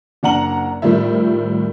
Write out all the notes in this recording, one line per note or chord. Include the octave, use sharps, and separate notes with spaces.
F#1 D4 F#5 A#5 F#7
A2 D#3 F3 G3 E5